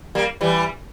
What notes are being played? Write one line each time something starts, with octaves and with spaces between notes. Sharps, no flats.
G3 A#3
E3 G3